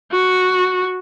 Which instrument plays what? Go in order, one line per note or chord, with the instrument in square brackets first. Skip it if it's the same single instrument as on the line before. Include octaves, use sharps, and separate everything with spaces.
[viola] F#4